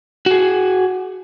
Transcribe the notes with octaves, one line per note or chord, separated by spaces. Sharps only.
F#4 G#4